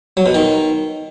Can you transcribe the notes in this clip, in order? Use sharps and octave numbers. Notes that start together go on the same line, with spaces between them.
F#3
B2
D#3